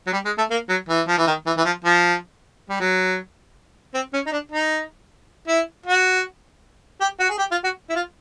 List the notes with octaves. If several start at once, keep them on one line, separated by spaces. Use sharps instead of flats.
F#3
G3
G#3
A3
A#3
F#3
E3
F3
E3
D#3
E3
E3
F3
F3
G3
F#3
C4
C#4
D#4
D4
D#4
E4
F#4
G4
F#4
G#4
G4
F4
F#4
E4
F4